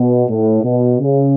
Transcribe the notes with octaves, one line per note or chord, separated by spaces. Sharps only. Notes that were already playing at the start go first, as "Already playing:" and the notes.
Already playing: B2
A2
B2
C#3